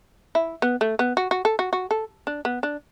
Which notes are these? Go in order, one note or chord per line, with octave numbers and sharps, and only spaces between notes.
E4
B3
A3
B3
F#4
F#4
A4
F#4
F#4
A4
D4
B3
D4